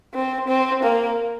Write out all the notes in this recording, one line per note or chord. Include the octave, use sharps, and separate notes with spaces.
C4
C4
A#3